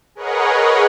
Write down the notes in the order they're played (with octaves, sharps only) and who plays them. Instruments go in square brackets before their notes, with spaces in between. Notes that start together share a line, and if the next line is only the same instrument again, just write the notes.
[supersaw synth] G#4 A#4 B4 C#5 D#5 F#5